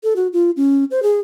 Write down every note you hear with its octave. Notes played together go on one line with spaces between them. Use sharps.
A4
F#4
F4
C#4
C5
G#4